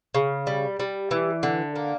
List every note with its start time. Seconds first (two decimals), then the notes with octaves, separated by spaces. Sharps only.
0.14 C#3
0.47 G3
0.80 G3
1.11 E3
1.43 D3
1.76 A#3